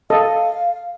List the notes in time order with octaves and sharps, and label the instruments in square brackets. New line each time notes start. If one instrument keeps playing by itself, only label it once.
[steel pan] A4 D#5 [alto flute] F5